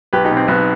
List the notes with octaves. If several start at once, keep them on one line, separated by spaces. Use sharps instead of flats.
B1 G4 B4
D#4 G4
B2
C4
B1 B3